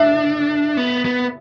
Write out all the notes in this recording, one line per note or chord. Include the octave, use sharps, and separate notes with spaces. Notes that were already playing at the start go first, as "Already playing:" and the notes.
Already playing: D4 E5
B3
B3